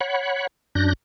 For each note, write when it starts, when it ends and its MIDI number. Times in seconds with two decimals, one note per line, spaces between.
0.01 0.47 73
0.01 0.47 78
0.01 0.47 83
0.75 0.93 42
0.75 0.93 62
0.75 0.93 90
0.75 0.93 91
0.75 0.93 94